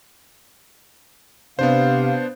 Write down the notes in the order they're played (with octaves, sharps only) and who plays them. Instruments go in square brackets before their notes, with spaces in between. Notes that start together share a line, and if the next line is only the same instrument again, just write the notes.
[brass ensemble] C3 F5 [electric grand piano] B3 D4 C5